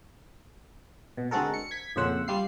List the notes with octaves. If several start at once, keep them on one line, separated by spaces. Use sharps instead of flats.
B2
D3 G#3 C4 F#4 A4 A#4
C#7
G#6 B6
F2 A#2 C#3 C5 F#5 E6
G3 F4 C7